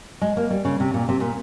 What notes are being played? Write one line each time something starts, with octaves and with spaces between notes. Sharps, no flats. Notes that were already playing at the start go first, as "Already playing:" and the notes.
G#3
A#3
G3
C#3
C3
A#2
C3
A#2